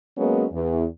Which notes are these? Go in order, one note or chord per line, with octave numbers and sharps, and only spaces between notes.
F#3 G#3 A#3 B3 C#4
E2